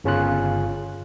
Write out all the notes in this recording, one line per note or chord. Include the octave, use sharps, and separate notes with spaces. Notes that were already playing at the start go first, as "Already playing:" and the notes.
G1 C#3 C#4 F4 F#6